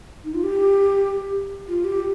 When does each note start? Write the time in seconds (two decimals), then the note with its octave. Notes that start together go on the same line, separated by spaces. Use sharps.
0.24 D#4
0.34 F4
0.43 G4
1.68 F4
1.84 G4